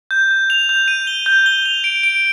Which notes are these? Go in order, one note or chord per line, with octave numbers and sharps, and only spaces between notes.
G6
G6
F7
G6
D#7
G7
G6
G7
F7
D7
D7